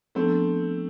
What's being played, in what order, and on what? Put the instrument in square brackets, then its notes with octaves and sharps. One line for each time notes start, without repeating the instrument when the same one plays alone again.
[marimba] F3 B3 D4 [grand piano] A3 C4